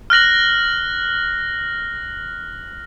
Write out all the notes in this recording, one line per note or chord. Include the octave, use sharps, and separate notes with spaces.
F6 F#6 A#6 F#7